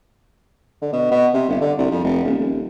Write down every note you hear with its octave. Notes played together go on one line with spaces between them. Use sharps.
D3
B2
B2
C3
G1
D3
C2
F2
F1
D#1
D#1